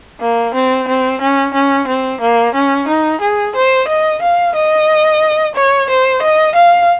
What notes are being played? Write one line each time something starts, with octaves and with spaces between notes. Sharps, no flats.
A#3
C4
C4
C#4
C#4
C4
A#3
C#4
D#4
G#4
C5
D#5
F5
D#5
C#5
C5
D#5
F5